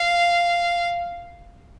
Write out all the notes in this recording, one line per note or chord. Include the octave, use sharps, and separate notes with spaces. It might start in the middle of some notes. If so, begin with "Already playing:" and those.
Already playing: F5